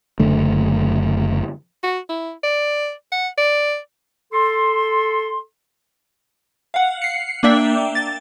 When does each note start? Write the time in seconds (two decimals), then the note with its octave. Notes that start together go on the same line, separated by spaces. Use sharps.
0.20 F#1 F#2 D3 A3
1.83 F#4
2.09 E4
2.44 D5
3.12 F#5
3.38 D5
4.33 A4 C6
6.74 F5 F#5
7.02 C7 C#7
7.43 A#3 D4 D5 E5 G5
7.95 A6